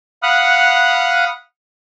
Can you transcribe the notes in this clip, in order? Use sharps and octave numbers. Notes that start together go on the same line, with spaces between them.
F5 F#5 B5 D#6 F6 F#6